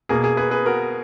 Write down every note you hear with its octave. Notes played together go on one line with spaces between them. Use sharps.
B2 A#3 G#4
G#4
G#4 B4
G#4 B4
F#4 A#4